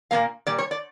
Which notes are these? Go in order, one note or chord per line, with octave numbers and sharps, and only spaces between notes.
A#2 G3 A#3 F5
A#2 G3 D5
C#5
D5